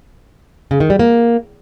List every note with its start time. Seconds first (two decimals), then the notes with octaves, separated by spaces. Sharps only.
0.71 C#3
0.80 D#3
0.90 G3
0.99 A#3